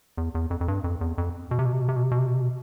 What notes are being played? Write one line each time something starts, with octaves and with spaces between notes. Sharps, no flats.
E2
E2
F2
F2
G2
F2
E2
F2
B2
C3
B2
C3
B2
C3
B2
C3
B2
C3
B2
C3
B2